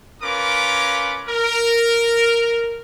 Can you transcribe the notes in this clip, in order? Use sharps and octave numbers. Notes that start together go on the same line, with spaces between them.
C#4 F4 A#4 B4 D6
A#4